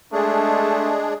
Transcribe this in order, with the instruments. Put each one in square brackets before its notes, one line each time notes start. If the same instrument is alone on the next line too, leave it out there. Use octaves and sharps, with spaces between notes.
[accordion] G#3 D4 G#4 [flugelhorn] A3